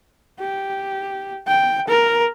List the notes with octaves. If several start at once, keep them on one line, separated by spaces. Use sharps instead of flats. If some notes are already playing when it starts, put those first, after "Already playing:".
G4
G5
A#4